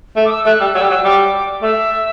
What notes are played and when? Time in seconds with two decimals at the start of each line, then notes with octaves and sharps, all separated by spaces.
0.16 A3
0.25 D6
0.31 E6
0.46 A3 F#6
0.60 G3 E6
0.74 F#3 E6
0.82 G3
0.89 F#3 E6
1.04 G3 D6
1.62 A3 E5